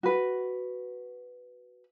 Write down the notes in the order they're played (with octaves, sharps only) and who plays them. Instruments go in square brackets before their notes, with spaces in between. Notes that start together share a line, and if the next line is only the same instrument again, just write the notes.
[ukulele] F#4 B4